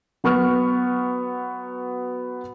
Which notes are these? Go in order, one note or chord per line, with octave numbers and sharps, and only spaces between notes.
F#3 B3 C#6 F6